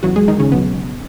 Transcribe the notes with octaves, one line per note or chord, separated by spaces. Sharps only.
E2 C#3 E3 F#3 F#4
G#3 G#4
D#3 D#4
C#3 C#4
B1 B2 F#3 B3